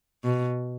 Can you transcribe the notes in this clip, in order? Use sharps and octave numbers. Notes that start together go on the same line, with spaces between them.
B2